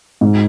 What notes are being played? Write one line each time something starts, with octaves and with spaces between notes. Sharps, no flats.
G#2